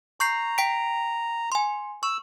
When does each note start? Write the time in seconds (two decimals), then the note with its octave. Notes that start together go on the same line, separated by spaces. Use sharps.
0.20 A#5 C#6 G6 C7
0.58 G5 B6 D7
1.52 G#5 C6
2.03 C#6 E6